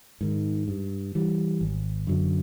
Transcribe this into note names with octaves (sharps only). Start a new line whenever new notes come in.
G#2 D#3
G2
E3 G3
G#1
F#2 D3 F#3